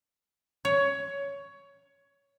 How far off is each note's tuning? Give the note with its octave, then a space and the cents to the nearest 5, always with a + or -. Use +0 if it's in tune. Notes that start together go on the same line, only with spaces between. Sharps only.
C#5 +15